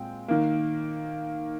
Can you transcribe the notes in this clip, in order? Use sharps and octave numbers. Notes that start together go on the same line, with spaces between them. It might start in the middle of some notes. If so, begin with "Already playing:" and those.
Already playing: A#2 G#3 C4 G5
D#3 A#3